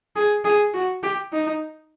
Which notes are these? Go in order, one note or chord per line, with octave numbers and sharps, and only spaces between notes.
G#4
G#4
F#4
G4
D#4